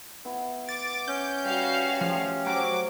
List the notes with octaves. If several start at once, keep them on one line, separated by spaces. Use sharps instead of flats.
B3 E4
D6 A6
C#4 G6
G3 F#4 F5
F3 A3 G4
F#3 F#4 C5 D6